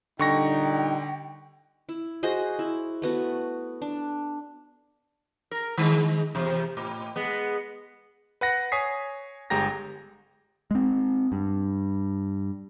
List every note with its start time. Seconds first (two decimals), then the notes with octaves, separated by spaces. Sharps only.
0.19 A#2 D3 G3 D#4 G5 C#6 A#6
1.89 E4
2.23 F#4 G#4 C5 D#5
2.59 E4
3.02 A3 B3 F#4
3.82 D4
5.51 A#4
5.78 D#3 G#3
6.35 E2 C3
6.77 A2
7.16 G#3 B3
8.41 B4 F#5 A#6
8.72 C#5 G#5 D#6 B6 C7
9.50 G1 G#3 G4 A#5 A#6
10.71 G#3 C4
11.32 G2